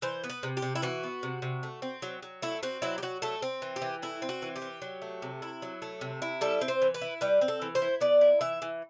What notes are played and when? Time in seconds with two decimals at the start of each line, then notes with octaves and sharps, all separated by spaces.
0.02 E3 C5
0.24 B3
0.30 B4
0.43 C3
0.57 G4
0.62 C3
0.75 E4
0.82 E3 F#4
1.03 B3
1.23 C3
1.42 C3
1.63 A3
1.82 C4
2.02 F#3
2.23 F#3
2.42 A3 E4
2.63 C4 F#4
2.82 F#3 E4
2.98 G4
3.02 F#3 F#4
3.22 A3 A4
3.42 C4
3.62 E3
3.76 G4
3.82 E3
4.02 A3 E4
4.22 C4
4.29 F#4
4.42 E3
4.56 G4
4.62 E3
4.82 F#3
5.02 A3
5.22 C3
5.42 E4
5.62 F#3
5.82 A3
6.01 C3
6.22 E4
6.41 G3 A4
6.61 C4
6.68 C5
6.82 E3
6.94 B4
7.01 E4
7.21 G3 B4
7.41 C4
7.48 A4
7.62 E3
7.75 C5
7.82 E4
8.01 B3 D5
8.21 E4
8.41 E3 E5
8.62 E3